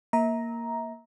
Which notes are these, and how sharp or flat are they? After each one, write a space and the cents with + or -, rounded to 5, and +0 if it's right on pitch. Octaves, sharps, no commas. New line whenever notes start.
A#3 +0 E5 -30 A#5 +5